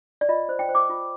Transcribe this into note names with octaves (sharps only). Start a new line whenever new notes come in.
D5
F4 D#5
C5
G5
C5
D6
F4